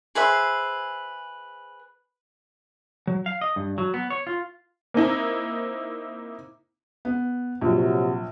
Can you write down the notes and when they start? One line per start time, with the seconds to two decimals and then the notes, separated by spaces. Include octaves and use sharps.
0.15 G#4 B4 C5 E5
3.07 F#3
3.26 F5
3.41 D#5
3.56 G2
3.78 F#3
3.94 B3
4.10 C#5
4.27 F4
4.94 A#3 C4 D#4 E4
7.05 B3
7.61 A#1 C3 F#3